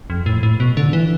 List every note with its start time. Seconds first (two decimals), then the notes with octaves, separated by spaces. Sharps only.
0.10 F2
0.26 A2
0.43 A2
0.60 B2
0.77 D3
0.93 E3